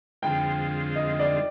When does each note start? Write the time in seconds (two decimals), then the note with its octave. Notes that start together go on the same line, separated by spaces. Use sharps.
0.23 F2 D3 G#3 C4 F4 G5
0.96 D#5
1.19 D5